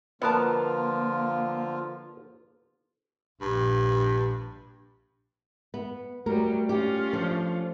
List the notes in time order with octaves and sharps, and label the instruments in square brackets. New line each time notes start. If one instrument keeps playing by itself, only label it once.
[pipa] B2 A#4 A5 [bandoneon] D3 F3 F4 [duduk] A#3 [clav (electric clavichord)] B3
[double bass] A#1 [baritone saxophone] G2
[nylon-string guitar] B3
[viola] F#3 G3 [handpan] A3 [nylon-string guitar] A#4
[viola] C#4 F4 [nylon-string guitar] G4
[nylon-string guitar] F3 D4 [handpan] A4